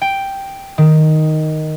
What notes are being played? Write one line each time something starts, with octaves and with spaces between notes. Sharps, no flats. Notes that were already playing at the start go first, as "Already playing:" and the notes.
G5
D#3